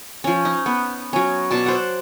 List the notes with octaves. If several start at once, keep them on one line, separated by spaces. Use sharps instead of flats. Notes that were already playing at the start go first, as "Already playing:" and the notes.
F3 C#4
D#4
B3
F#3 C#4
B2 D5 A5
C5 F#5